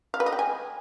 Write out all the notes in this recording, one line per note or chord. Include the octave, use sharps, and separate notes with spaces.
F5
B4
D#5
G5
G#5